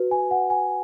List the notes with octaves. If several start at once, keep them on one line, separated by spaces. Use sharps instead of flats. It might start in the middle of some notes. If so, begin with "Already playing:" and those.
Already playing: F#4 B4
G#5
F#5
G#5